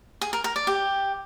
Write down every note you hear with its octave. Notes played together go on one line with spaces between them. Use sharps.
G#4
A#4
A#4
D5
G4